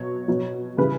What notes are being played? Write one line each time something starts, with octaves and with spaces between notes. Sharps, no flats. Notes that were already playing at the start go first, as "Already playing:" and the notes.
Already playing: B2 F#3 C#5
B2 F#3
C#3 E3 G3 B4